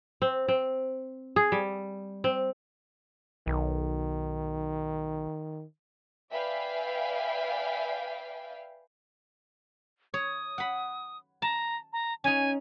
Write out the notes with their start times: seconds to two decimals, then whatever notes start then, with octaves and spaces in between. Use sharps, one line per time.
0.22 C4
0.48 C4
1.36 G#4
1.52 G3
2.24 C4
3.47 B1 D#3
6.31 B4 D5 E5 F5 G5 G#5
10.14 C#5 D#6
10.58 F#5 B5
11.42 A5 A#5
11.93 A#5
12.24 C#4 D#4 G#5